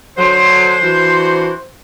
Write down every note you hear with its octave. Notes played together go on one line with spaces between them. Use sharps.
D3 F#3 C5
E3 D4 F#4